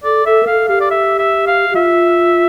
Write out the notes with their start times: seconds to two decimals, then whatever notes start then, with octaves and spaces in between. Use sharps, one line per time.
0.04 A4 D5
0.26 A4 E5
0.43 A#4
0.47 A4 F5
0.68 G4 F5
0.80 D5
0.91 E5
1.19 E5
1.47 F5
1.71 G4
1.75 F4 E5